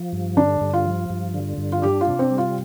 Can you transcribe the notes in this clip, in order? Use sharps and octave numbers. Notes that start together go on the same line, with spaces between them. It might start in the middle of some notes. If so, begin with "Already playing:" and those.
Already playing: F3
G2
D3 D4
G2
F4
F3
G2
D3
G2
F4
D4 G4
F4
C3
C4
G3
F4